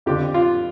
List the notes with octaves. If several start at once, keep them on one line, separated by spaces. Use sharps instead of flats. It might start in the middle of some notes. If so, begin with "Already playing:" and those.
F2 D3 G4
F4